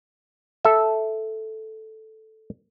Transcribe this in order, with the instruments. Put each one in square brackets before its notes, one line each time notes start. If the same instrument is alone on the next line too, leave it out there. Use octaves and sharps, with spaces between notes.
[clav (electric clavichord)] A4 E5